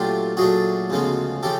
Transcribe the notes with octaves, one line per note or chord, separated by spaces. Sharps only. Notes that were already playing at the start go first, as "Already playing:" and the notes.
Already playing: A#2 F#3 A3 D4 F4 G4
A#2 F#3 A3 D4 F#4 G#4
D2 C#3 F3 G#3 B3
C#3 F3 G4 A4